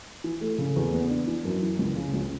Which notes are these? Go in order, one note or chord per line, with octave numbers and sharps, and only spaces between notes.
E3
A3
C#3
E2
B3
D4
E3
F#2
E3
C#2
C#3
C#2